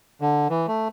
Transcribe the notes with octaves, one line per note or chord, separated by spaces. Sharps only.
D3
E3
A3